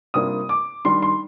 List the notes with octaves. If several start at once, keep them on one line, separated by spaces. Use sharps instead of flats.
C3 G3 A#3 D4 F4 D#6
D6
D#3 G3 D4 C6
C6